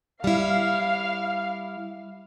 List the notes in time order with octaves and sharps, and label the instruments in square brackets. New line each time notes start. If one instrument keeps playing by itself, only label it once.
[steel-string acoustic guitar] G3 E4 [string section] F5